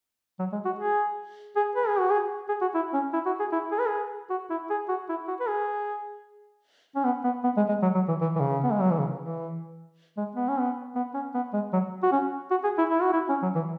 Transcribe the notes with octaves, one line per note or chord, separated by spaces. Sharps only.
F#3
G#3
F#4
G#4
G#4
B4
G#4
F#4
G#4
G#4
F#4
E4
C#4
E4
F#4
G#4
E4
G#4
B4
G#4
F#4
E4
G#4
F#4
E4
F#4
B4
G#4
C#4
B3
B3
B3
G#3
G#3
F#3
F#3
E3
E3
E3
C#3
B3
G#3
F#3
E3
C#3
E3
G#3
B3
C#4
B3
B3
C#4
B3
G#3
F#3
F#4
C#4
F#4
G#4
E4
E4
F#4
E4
C#4
F#3
E3